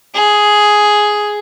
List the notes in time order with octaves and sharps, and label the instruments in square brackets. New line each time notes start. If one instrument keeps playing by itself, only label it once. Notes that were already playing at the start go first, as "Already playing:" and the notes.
[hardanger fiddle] G#4